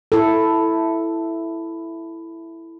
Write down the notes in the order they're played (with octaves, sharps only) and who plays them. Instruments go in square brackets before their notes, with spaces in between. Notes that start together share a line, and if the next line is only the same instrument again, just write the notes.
[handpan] E4 A4